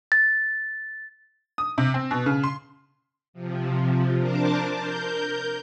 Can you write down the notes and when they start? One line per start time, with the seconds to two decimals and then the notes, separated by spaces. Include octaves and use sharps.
0.12 A6
1.58 D#6
1.78 C3
1.94 C4
2.11 B2
2.26 C#3
2.44 C6
3.33 C3 F3
4.19 D4 A#4 C5 A5 D6
4.73 A#4 G6